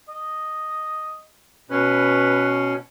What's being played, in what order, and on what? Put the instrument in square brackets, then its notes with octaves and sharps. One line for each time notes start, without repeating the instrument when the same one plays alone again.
[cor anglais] D#5
[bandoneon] B2 C#4 [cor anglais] B4